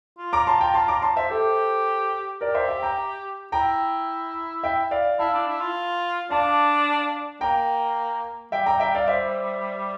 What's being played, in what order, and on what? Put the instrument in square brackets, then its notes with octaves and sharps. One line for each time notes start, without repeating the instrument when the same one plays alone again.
[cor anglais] F4
[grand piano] A#5 D6
A5 C6
G5 A#5
A5 C6
A#5 D6
A5 C6
C5 E5
[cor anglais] G4 [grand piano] A4 C5
[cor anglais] G4 [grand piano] A#4 D5
[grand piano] C5 E5
E5 G5
G5 A#5
[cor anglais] E4 [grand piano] G5 A#5
[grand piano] E5 G5
D5 F5
[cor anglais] E4 [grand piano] F5 A5
[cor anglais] D4
E4
F4
[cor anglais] D4 [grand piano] F5 A5
[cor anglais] A#3 [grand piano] G5 A#5
[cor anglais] G3 [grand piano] E5 G5
[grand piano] G5 A#5
E5 G5
D5 F5
C5 E5